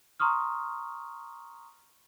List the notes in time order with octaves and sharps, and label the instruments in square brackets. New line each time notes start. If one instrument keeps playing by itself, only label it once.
[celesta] A#5 C6 C#6 D#6 F6